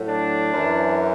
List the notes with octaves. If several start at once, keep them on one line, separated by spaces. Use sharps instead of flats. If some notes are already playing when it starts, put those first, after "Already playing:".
Already playing: A2 F#3
D4
F#2 E3